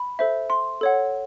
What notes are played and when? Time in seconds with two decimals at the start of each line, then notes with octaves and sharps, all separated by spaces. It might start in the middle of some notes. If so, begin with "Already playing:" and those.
Already playing: B5
0.19 A4 C5 E5
0.50 C6
0.81 A4 C#5 F#5